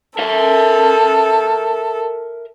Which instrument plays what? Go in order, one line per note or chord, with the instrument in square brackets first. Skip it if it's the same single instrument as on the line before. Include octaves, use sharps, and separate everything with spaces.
[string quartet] A4 [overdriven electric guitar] A#4 E5